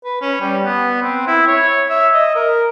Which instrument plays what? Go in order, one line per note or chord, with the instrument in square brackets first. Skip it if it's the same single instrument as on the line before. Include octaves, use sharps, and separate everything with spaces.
[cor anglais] B4
C#4
G3
B3
C4
E4
C#5
E5
D#5
A#4